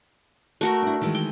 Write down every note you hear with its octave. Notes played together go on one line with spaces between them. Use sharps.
A3 F#4 A#4
D4 E4
D#3 E3 G#3
G5